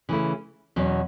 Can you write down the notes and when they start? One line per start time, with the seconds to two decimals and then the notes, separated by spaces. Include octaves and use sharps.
0.09 C#3 E3 A3 E4
0.76 E2 B2 F#3 C#4